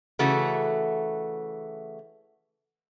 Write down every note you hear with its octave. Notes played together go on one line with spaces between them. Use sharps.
C#3 E3 A3 F#4